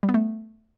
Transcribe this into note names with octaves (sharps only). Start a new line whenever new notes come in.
G3
B3
A3